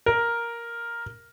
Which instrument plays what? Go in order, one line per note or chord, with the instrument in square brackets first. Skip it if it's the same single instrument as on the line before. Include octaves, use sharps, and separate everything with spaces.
[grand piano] A#4